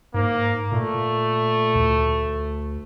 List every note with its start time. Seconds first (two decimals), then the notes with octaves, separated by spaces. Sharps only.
0.14 G#2 A#3
0.72 A#2 A3
1.75 D2